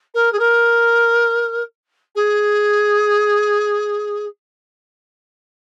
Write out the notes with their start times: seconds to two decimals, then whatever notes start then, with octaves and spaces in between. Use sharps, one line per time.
0.14 A#4
0.32 G#4
0.39 A#4
2.15 G#4